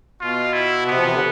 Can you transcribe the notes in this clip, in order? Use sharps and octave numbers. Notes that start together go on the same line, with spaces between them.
B2 F4
E4
C3 B3
F3
E3
D3